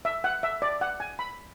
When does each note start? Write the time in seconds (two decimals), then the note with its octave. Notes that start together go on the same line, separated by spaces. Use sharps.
0.05 E5
0.24 F#5
0.43 E5
0.62 D5
0.81 F#5
1.00 G#5
1.19 B5